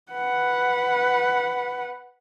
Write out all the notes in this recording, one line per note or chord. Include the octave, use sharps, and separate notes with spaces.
B4 F#5